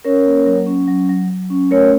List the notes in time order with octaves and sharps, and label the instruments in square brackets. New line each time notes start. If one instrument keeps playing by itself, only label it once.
[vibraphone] C#4 A#4 C#5
A#3
F#3
C#4
F#3
F#3
F#3
C#4
A3 A#4 C#5